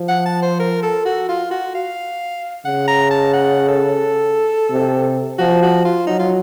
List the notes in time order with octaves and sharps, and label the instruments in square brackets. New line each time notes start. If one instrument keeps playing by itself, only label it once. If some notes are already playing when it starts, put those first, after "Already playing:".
Already playing: [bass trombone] F3
[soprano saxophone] F#5
A5
C5
A#4
A4
F#4
F4
F#4
F5
[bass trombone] C#3 [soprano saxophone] F#5
[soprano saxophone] A#5
A5
F#5
A4
[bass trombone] C3
[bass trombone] F3 [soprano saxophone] F#4
[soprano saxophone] F#4
F4
[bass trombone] F#3 [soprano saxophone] D#4
[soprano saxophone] F4